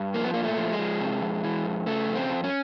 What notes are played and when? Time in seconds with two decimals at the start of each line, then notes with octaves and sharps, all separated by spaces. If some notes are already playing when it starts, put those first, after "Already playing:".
Already playing: G2
0.14 F3 A#3
0.24 B3
0.34 A#2 A#3
0.44 A3
0.58 F3
0.72 G#3
0.79 F3
1.01 C3
1.22 F2
1.44 E3
1.65 F2
1.86 C#3 A3
2.08 F2
2.15 C4
2.30 F2
2.44 C#4